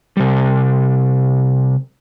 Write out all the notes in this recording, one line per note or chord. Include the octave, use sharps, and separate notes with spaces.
C3 G3